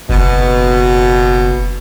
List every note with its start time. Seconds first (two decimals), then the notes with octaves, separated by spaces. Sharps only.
0.09 F#1 B2